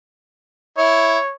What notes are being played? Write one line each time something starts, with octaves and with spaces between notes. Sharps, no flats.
E4 C#5